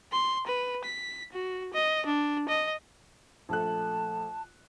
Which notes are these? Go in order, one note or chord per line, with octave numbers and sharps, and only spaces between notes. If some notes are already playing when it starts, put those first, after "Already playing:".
C6
B4
B6
F#4
D#5
D4
D#5
A#1 A3 A5 F#6